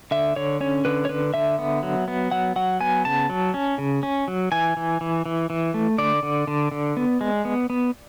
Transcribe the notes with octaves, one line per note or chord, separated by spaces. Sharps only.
D3 E5
D3 C#5
C#4 C#5
D3 B4
C#5
D3 B4
D3 E5
B3
F#3
B3
F#3 F#5
F#3 F#5
B3 G#5
C#3 A5
F#3
C#4
C#3
C#4
F#3
E3 G#5
E3
E3
E3
E3
A3
D3 D5
D3
D3
D3
B3
G#3
B3
B3